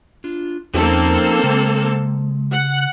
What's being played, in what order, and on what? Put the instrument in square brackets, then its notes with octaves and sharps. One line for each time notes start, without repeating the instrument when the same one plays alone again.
[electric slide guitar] D4 F4
[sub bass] E2 [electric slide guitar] F3 C#4 D#4 [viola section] A#3 C4 A4
[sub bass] C#3 [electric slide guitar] G#3
[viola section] F#5